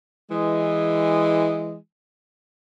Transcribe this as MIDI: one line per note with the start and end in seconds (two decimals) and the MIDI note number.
0.31 1.75 52
0.31 1.75 56